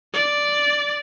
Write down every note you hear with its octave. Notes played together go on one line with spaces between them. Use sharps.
D5